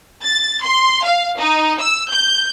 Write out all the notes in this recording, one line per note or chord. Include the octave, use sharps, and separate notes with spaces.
A6
C6
F5
D#4
E6
G6